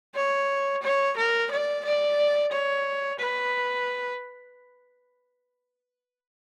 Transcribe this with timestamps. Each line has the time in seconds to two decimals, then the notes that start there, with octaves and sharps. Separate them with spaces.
0.15 C#5
0.82 C#5
1.17 A#4
1.51 D5
1.85 D5
2.52 C#5
3.19 B4